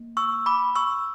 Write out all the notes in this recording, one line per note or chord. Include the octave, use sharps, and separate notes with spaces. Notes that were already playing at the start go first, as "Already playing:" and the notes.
Already playing: A#3
C#6 E6
B5 D6
C#6 E6